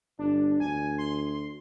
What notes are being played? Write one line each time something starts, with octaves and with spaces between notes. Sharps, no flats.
G1 D4
D2 G#5
C6